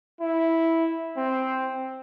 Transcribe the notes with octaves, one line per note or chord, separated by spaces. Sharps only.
E4
C4